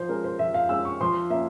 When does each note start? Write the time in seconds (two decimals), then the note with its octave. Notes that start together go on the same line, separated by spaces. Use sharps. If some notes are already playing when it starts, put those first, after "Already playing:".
Already playing: F3 C5
0.09 G#3 C#4 A#4
0.24 C5
0.39 F3 E5
0.54 F5
0.69 G#3 C#4 E6
0.85 C#6
1.01 F3 C6
1.30 A#3 C#4 E5